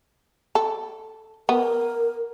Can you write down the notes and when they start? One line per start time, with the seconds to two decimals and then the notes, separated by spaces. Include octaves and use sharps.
0.55 A4
1.49 B3 A#4